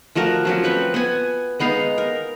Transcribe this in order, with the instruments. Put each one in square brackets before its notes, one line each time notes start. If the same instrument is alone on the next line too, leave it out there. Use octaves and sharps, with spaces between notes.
[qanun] F3 A3 F#4 A#4
F3 F#3 C#4
C4 B4 C#5
B3 G#5
G#3 B3 D#4 F5
A#4